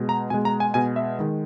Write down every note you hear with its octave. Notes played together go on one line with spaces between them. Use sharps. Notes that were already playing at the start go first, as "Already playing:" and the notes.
Already playing: B2 G#3
A#5
B2 G#3 G#5
A#5
G#5
B2 G#3 G#5
E5
D#3 G#3